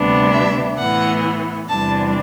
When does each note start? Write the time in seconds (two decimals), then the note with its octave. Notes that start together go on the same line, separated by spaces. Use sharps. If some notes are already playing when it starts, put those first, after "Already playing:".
Already playing: D2 C3 G3 B3 D4
0.33 E5
0.78 A2 E3 B3 F#5
1.69 E2 C3 G3 D4 A5